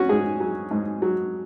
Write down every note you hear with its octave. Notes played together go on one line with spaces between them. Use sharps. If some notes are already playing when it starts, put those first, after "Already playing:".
Already playing: F#3 C#4 F#4
G#2 G#4
F#3
G#2
F#3